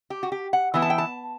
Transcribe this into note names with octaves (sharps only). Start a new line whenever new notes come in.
G4
F#4
G4
F#5
E3 B3 E4
A5
G5
A5